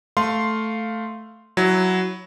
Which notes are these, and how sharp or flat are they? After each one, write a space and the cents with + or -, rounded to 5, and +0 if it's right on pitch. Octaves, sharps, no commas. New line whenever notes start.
A3 +0 F5 +0 C6 +0
F#3 +0 E4 -5